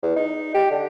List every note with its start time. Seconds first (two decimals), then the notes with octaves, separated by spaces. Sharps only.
0.02 E2
0.16 D#4
0.54 G4
0.71 D3